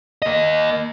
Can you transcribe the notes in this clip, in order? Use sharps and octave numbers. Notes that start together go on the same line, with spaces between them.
A#3 D#5